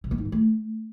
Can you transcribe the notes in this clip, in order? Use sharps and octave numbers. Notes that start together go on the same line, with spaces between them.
C3
A#3
G#2
F3
A3